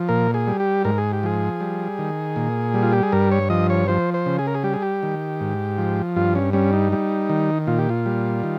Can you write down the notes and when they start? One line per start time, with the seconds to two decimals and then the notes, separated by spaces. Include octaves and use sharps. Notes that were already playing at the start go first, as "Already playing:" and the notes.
Already playing: F3
0.08 A#2 A#4
0.34 G#4
0.48 G3
0.60 G4
0.85 G#2 A#4
0.98 G#4
1.13 G4
1.23 F3 G#4
1.60 G3
1.99 D#3
2.36 A#2
2.74 G3
2.82 F4
2.92 G4
3.03 G#4
3.12 G2 A#4
3.31 C#5
3.50 F3 D#5
3.70 C#5
3.88 F3 C5
4.14 C5
4.26 C#3
4.39 G#4
4.47 A#4
4.55 G#4
4.64 G3 G4
4.73 G#4
4.82 G4
5.03 D#3
5.41 G#2
5.78 F3
6.16 G2 F4
6.35 C#4
6.53 G3 C#4
6.73 D#4
6.92 G3
7.29 D#3
7.67 A#2 F4
7.78 G4
7.89 F4
8.06 G3
8.43 D#3